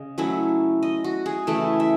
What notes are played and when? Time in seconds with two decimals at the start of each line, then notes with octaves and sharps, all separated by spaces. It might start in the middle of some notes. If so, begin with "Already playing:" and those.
Already playing: C#3 D#5
0.18 F#3 A3 C#4 E4
0.83 D#5
1.04 F#4
1.26 G#4
1.47 C#3 E3 A3 E4
1.80 E5